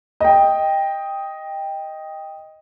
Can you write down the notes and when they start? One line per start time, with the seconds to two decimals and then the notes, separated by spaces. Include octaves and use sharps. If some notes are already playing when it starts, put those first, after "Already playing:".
0.20 D#5 G5